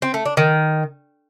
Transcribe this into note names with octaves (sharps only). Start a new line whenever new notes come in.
C4
A3
D4
D#3